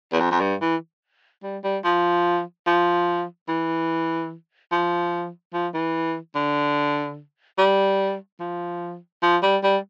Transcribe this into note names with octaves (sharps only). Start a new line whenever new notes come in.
E2
F2
F2
G2
E3
G3
G3
F3
F3
E3
F3
F3
E3
D3
G3
F3
F3
G3
G3